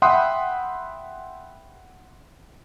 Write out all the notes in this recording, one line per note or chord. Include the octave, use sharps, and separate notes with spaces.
E5 F#5 G5 B5 C6 D#6